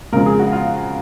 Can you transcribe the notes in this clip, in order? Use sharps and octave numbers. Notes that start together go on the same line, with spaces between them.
F2 C#3 G#3 A#4
G#4
F#4
F4